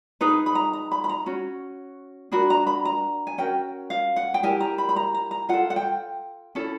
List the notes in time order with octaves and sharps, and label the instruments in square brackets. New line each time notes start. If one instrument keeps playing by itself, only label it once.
[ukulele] D#4 G#4 B4 A#5
B5
A#5
A#5
B5
B5
A#5
C#4 F#4
D4 F#4 A#4 B5
A#5
B5
A#5
G#5
C#4 F#4 A#4 G5
F5
F#5
G5
E4 G4 A#4 G#5
A#5
B5
B5
A#5
A#5
A#5
F4 A4 F#5
F#5
G5
C#4 E4 A4